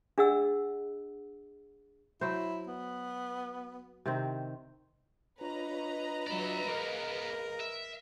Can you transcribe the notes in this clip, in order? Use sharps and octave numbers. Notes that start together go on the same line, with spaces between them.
D4 G#4 D#5 F#5 E6
F#3 E4 C5
B3
C3 D#3 C4
D4 F4 B4 C#5 D#5 A#5
F#3 D5 E5
A#3 B3 G#4 A#4 F5
E5